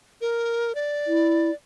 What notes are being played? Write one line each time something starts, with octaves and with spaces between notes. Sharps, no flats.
A#4
D5
E4